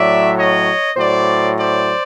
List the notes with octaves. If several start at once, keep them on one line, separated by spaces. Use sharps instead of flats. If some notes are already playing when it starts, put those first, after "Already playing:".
Already playing: A2 F#3 D5 E5
C#5 D#5
A2 F#3 C5 D5
C5 D5